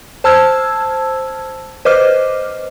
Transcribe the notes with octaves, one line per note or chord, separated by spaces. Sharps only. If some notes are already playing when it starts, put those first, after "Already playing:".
C5 A5 E6 F6 G#6
B4 C5 D#5 D6 F6